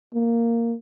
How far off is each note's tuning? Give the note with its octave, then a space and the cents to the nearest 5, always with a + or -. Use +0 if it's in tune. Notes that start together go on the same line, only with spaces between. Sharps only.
A#3 -5